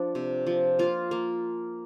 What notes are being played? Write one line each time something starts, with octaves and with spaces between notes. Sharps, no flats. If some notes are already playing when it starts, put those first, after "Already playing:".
Already playing: F3 D4
C3
F3
A#3 F4
A#3